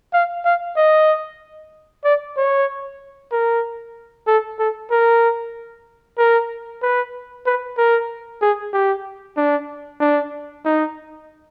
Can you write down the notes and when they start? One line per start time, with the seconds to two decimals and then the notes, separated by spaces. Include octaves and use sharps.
0.14 F5
0.45 F5
0.77 D#5
2.04 D5
2.37 C#5
3.32 A#4
4.27 A4
4.59 A4
4.91 A#4
6.18 A#4
6.82 B4
7.46 B4
7.78 A#4
8.42 G#4
8.73 G4
9.37 D4
10.00 D4
10.65 D#4